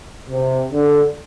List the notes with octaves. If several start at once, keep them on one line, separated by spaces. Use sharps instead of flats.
C3
D3